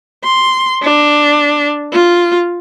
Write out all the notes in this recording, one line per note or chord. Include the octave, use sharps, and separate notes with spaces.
C6
D4
F4